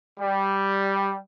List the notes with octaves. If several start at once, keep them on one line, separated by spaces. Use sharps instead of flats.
G3